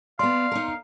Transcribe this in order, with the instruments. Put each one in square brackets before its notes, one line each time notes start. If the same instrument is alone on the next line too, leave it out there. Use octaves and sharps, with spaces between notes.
[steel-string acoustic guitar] B3 D5 [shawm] F5 [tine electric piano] C6
[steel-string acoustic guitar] D#4 A#4